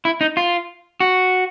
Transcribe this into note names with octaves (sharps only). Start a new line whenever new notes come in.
E4
D#4
F4
F#4